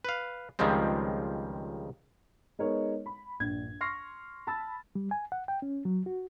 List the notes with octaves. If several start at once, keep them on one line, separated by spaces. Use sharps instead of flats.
B4 F5
C#2 D#3 F3 G3 G#3 C4
G#3 B3 D#4 A#4 C#5 D#5
B5
A#1 G2 G#6
C6 C#6 F6 A#6 C7
A5 B5 E6 A6
G3
G#5
F#5
G5
C#4
F#3
F#4